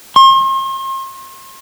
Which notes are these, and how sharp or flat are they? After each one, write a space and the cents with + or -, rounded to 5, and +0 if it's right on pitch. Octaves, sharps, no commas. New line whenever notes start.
C6 +40